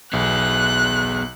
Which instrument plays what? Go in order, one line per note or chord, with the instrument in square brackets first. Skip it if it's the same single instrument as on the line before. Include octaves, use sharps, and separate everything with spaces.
[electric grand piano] B1 [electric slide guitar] B3 G#4 [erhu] F#6